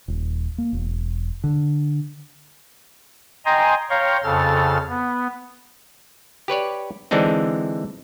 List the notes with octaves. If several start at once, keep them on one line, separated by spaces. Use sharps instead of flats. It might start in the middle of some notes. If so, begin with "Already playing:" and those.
D#1
A#3
E1
D3
D#5 G5 G#5 A#5 C6
C#5 F5 G5 A#5 C6 C#6
F2 C#3 A4 F6 A6
B3
G4 B4 C#5 D5
D3 E3 G#3 C4 D4 D#4